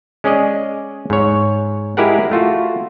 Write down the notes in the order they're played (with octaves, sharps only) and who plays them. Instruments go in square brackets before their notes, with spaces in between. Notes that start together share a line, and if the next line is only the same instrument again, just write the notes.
[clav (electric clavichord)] G#3 C#4 G#4 D5 D#5
G#2 C#5
G#3 E4 G4 G#4 A#4 F#5
A3 F4 F#4